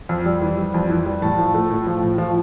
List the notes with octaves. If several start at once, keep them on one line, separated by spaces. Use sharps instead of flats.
F2
G3
E3
G3
F2
E3
G3
A2 A5
F3
A3
A2
F3
A2
F3